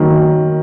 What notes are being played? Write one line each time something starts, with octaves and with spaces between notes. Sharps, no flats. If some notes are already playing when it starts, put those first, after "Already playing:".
Already playing: D#3 F#3 A#3 A#4